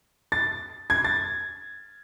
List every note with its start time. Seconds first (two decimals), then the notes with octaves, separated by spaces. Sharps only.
0.32 A6
0.90 G#6
1.04 A6